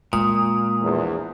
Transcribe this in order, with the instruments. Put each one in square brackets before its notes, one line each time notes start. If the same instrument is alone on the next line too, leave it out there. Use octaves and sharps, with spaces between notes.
[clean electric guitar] A#2 [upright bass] G#3 [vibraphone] D#6
[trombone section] A#1 E2